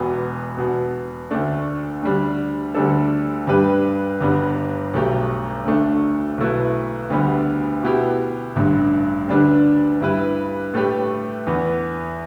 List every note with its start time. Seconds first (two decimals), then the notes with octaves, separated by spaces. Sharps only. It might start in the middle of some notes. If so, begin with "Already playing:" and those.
Already playing: E1 E2 B2 B3
0.57 E2 B2 B3
1.31 D2 D3 A3 D4
2.03 D2 D3 G3 D4
2.75 D2 D3 G3 D4 A4
3.47 G2 G3 D4 G4 B4
4.21 G1 G2 G3 B3 D4
4.93 B1 B2 A3 G4
5.65 D2 D3 A3 D4
6.38 B1 B2 A3 E4 B4
7.10 D2 D3 G3 B3 G4
7.83 B2 B3 E4 G4
8.56 A1 G2 D3
9.28 D2 D3 G3 D4 B4
10.01 G2 G3 E4 B4
10.74 A2 A3 G4 B4
11.46 E2 E3 B3